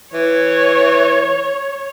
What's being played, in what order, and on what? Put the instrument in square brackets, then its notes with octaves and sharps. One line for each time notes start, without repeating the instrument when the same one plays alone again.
[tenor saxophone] E3 [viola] C#5